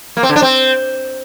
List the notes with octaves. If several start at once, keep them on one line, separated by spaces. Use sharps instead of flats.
A#3
C4
D3
D4
C4